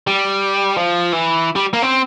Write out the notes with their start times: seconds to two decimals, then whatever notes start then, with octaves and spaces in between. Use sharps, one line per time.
0.07 G3
0.77 F3
1.12 E3
1.56 G3
1.73 A#3
1.83 C4